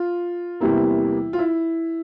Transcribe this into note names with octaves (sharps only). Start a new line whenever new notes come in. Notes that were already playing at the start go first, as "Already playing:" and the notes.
Already playing: F4
E2 C3 E3 G3 A#3 E4
F4
E4